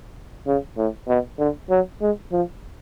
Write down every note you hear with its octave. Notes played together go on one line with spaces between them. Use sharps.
C#3
A2
B2
D3
F#3
G#3
F3